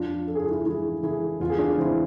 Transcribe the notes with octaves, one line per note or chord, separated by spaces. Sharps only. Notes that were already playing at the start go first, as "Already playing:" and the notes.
Already playing: F2 D4 F4
F2 A4
G#4
F4
E4 G#4
F4
E3 E4 G#4
E3 E4 G#4
E2 F4
G#4
D4 F4
E3 C4 E4